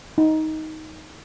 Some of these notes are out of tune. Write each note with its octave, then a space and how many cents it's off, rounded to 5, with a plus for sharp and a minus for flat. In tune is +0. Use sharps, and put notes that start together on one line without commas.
D#4 +10